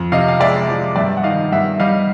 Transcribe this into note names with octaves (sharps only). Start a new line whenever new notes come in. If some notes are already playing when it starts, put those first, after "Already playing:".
Already playing: F2
C3 D#5 F5
F5
G#3 D5 E5
F3
G2 D5 E5
F#5
D#3 D#5 F5
G2 E5 F#5
G3 D#5 F5